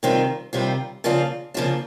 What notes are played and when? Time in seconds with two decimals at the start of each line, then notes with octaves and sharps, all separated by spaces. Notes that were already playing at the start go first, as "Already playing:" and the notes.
0.03 C3 D#3 G3 C4 F4
0.53 C3 D#3 G3 C4 F4
1.04 C#3 F3 A#3 D4 F4
1.54 C#3 F3 A#3 D4 F4